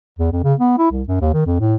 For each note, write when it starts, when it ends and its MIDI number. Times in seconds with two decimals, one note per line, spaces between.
0.19 0.31 40
0.32 0.41 41
0.44 0.54 49
0.60 0.76 59
0.78 0.90 64
0.91 1.03 36
1.08 1.17 42
1.21 1.30 39
1.33 1.43 51
1.46 1.58 41
1.60 1.76 45